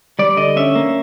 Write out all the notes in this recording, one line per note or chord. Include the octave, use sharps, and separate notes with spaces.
G3 D5
D3 D#5
C#4 E5
A#3